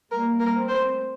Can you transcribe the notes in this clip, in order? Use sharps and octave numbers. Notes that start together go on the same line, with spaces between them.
G3 A#3 A#4
A#4
A3 C4
C5